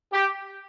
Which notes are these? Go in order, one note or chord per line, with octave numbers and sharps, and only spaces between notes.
G4